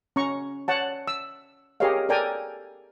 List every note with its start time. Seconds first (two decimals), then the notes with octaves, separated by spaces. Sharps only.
0.16 C#4 A#5 C#6
0.68 C#5 F#5 A5
1.08 E6
1.80 G4 G#4 A#4 C#5 D#5 F5
2.09 A4 A#4 D5 G5 G#5 A#5